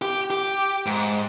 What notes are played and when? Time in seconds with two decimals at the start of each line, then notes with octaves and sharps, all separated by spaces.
0.02 G4
0.30 G4
0.86 G#2